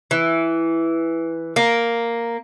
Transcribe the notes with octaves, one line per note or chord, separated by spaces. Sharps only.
E3
A#3